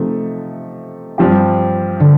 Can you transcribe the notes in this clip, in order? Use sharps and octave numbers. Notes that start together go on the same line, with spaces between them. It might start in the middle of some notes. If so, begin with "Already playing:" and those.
Already playing: C3 F3 A3 D#4
G2 F3 C4 G4
D3